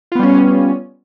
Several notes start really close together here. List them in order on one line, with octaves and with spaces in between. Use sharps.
F4 B3 G3 C#4